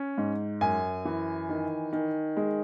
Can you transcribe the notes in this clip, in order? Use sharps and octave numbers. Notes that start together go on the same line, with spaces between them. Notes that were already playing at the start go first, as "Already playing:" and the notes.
Already playing: C#4
G#2
F#2 G#5
E3
D#3
D#3
G#3